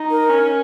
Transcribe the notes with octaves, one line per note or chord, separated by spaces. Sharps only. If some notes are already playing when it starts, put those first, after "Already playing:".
Already playing: D#4
A#4
C#4